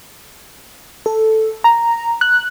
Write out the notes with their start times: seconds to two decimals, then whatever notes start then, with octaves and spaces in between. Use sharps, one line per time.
1.06 A4
1.64 A#5
2.21 F#6